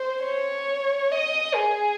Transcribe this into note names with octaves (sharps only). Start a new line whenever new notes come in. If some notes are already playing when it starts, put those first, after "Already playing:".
Already playing: C5
C#5
D#5
G#4